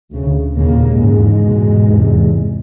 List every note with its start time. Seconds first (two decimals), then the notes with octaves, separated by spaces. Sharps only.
0.11 D2 C#3
0.55 D#2 A#2 C#3 A#3
1.00 E2 G#2 C#3 G#3
1.44 E2 B2
1.89 E2 C3